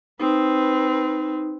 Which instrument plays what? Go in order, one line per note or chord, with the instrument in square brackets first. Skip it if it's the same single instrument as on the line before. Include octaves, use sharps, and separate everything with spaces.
[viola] C4 B4 [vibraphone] D#4